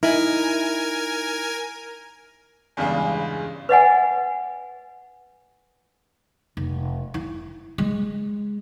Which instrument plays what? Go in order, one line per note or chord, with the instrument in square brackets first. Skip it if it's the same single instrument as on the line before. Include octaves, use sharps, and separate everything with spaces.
[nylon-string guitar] D#4 E4 [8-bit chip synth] A#4 G#5
[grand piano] E2 G2 C#3 G3 G#3
[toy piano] B4 D#5 F#5 G#5
[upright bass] F1
E4
G#3